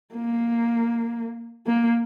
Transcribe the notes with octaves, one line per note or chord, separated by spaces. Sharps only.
A#3
A#3